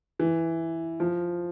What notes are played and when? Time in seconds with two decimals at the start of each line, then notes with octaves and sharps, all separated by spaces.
0.19 E3
1.00 F3